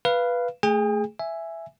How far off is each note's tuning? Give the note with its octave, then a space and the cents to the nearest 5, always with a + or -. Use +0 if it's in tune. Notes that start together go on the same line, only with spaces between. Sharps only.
B4 -5 F5 -15
A3 +0 G#4 +0 G5 +45
E5 +5 G#5 +0